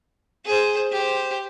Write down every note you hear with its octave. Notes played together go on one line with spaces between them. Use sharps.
G#4 C5
G4 C5